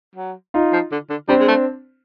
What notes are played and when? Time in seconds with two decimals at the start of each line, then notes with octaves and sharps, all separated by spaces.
0.16 F#3
0.54 D#4 F4
0.73 F3
0.92 D3
1.10 D3
1.28 G3 C4 D4
1.40 G#3
1.48 A3